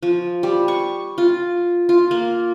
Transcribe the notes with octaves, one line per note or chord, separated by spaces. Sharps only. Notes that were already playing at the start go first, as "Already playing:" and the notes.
F3
G3
C#6
F4
F4
A#3